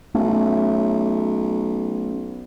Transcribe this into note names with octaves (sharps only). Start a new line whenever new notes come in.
B1 A3 C#4